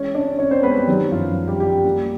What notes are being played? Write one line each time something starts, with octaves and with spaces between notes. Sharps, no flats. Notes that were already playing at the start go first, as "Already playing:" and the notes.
Already playing: E3 G#3 C#4 C#5
C4 D4 D5
C4 C#4 C#5
C4 C5
G#3 B3 B4
G3 G4
D#3 F#3 F#4
F#2 F3 F4
G3
G3 G4
G3 G4
A#3